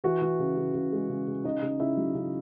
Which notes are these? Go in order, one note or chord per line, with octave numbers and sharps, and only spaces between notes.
E3 F#4
E3
C#3
C#3
C#3
G#3
C#3
C#3
C#3 D#4 D#5
C#3
C#3 E4 E5
F#3
C#3